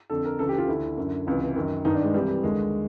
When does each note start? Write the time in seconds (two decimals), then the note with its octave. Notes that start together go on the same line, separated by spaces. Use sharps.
0.10 F2 D3 A4
0.25 A#4
0.39 C#2 C#3 E3 A4
0.49 G4
0.58 F4
0.68 D2 D3 E4
0.97 F#2 D3
1.27 C#2 C3 E3
1.56 F#2 D#3
1.85 G2 D#3 D#4
1.94 D4
2.04 G#3
2.13 C2 C3 E3 G3
2.43 D#2 D3 G#3